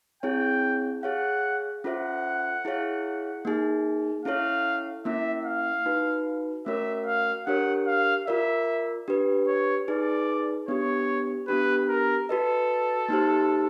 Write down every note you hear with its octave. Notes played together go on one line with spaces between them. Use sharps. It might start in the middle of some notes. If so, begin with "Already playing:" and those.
C4 E4 G#4 C#5 G5
G#4 C#5 F5 F#5
C#4 F4 A4 C5 E5 F#5
E4 G#4 C#5 F5
A#3 D#4 G#4
C#4 E4 A4 C#5 F5
A#3 C#4 E4 E5
F5
D#4 F#4 B4
A3 C#4 F#4 A#4 C#5 E5
F5
D4 G4 A#4 C#5 F#5
F5
F4 A#4 D5 E5
D4 G4 B4
C#5
D#4 G#4 B4 D5
B3 D4 G4 C#5
B3 D4 G4 B4
A#4
F#4 A4 B4 D#5
A#3 D#4 G4 C5